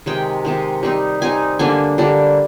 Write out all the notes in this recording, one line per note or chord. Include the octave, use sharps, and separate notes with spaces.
C3 D#3 G#3 G5
C3 D#3 G#3
G3 C4 D#4
G3 C4 D#4 G#5
D3 G3 A#3 D4 G#5
D3 G3 A#3 D4